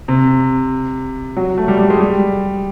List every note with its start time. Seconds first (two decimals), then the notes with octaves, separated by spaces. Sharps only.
0.08 C3
1.37 F#3
1.58 A3
1.68 G3
1.78 G3
1.90 G#3
2.00 G3